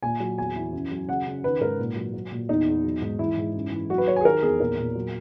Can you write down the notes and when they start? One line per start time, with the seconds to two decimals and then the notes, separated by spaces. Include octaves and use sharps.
0.03 A#2 G#5
0.20 F#3
0.38 E2 G#5
0.56 E3
0.73 F#2
0.91 F#3
1.08 C#3 F#5
1.26 C#3
1.43 D#3 B4
1.61 G#2 A#4
1.79 A#2
1.96 F#3
2.14 F#3
2.32 A#2
2.49 E2 D#4
2.67 E2
2.84 F#3
3.02 G#2
3.19 E3 E4
3.37 G#2
3.54 F#2
3.72 E3
3.90 F#3 F#4
3.98 B4
4.07 F#3 C#5
4.16 G#5
4.21 G#4
4.25 D#3 A#4
4.42 E2 G#4
4.60 A#2 A#4
4.78 A#2
4.95 F#3